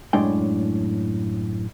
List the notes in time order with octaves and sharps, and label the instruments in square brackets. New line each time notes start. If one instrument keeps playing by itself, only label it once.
[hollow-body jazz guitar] F#2 A2 G#3 D4 G5